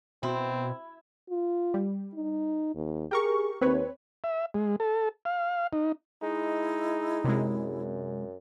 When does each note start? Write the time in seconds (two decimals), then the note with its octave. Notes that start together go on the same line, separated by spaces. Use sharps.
0.23 B2 C4 E4 F#4 C6
1.30 F4
1.74 G3
2.14 D#4
2.75 D#2
3.11 G4 G#4 A#4 C#6
3.61 D#2 C4 B4 C#5
4.24 E5
4.54 G#3
4.80 A4
5.25 F5
5.73 D#4
6.23 G#3 D#4 E4
7.24 F#2 C3 G#3